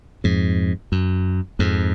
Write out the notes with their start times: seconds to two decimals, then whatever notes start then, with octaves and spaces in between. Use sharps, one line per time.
0.24 F2 G#2
0.92 F#2
1.59 F2 G#2